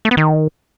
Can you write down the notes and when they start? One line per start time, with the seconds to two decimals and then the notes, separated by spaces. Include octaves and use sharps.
0.05 A3
0.11 B3
0.17 D#3